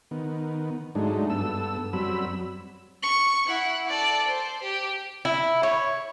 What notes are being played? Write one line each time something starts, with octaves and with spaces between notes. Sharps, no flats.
D#3 B3
G#2 F#3 G#3 A3 D4 D#4
G2 B3 A4 E6
F#2 F#3 G3 C4 B5 E6
C#6
E4 F#5
A4 D5
C5
G4
E4
C#5